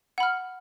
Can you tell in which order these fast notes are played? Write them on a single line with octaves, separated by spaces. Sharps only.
F#5 B5 F6